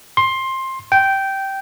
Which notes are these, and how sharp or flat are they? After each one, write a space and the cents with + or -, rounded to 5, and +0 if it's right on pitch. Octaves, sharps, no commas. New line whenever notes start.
C6 +15
G5 -10